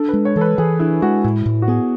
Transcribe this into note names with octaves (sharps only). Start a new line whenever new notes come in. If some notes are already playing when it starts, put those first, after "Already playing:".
Already playing: D4 A4
G#3 B4
C#5
E3 A4
B4
E3 G#4
D4 E4
G#3 F#4
A2 E4
A2
F#4
B3 G#4